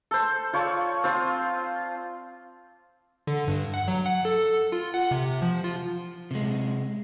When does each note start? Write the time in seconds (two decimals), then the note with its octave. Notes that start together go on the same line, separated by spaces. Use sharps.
0.11 A4 C5
0.53 F4 C#5 D5 A5
1.04 C4 F4 C5
3.27 D3
3.48 G2
3.74 F#5
3.88 F#3
4.06 F#5
4.25 A4
4.72 F4
4.94 F#5
5.11 C3
5.42 F3
5.64 F4
6.31 C3 G#3